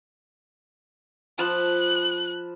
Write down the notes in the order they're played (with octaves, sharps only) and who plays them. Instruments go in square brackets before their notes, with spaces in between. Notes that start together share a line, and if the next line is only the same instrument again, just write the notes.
[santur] F3 A5 B5 [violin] F#6